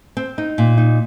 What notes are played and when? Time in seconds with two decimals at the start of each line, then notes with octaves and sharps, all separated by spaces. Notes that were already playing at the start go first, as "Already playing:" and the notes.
0.17 C4
0.38 D#4
0.58 A#2
0.77 D#4